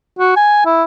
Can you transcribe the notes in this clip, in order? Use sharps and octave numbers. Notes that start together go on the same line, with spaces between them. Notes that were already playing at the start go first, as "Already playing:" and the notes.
F#4
G#5
E4